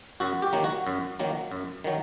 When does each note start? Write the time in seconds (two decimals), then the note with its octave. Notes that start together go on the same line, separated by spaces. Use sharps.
0.20 F#2 F#4
0.42 G4
0.53 D#3 F#3 A#3
0.64 F#4
0.87 F#2
1.19 D#3 F#3 A#3
1.51 F#2
1.84 D#3 F#3